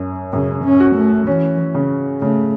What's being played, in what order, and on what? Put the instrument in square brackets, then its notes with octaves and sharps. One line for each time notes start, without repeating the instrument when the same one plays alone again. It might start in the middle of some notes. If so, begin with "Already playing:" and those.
Already playing: [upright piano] F#2 C#4
[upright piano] F#2 [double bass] C#3
[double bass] C#4
[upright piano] F#4
[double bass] A3
[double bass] E3 [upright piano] C#4
[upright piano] C#3
[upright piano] C#3 [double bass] A3